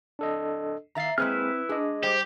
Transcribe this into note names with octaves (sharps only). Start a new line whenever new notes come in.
D4 A4 D#5
D#3 E5 F5 A#5 A6 C7
G#3 A#3 C4 E4 G#4 B4 F6
D4 G#4 D#5
G3 G4 C5